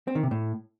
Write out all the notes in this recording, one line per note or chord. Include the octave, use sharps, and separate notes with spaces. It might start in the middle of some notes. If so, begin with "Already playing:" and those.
C4
D#3
C3
A2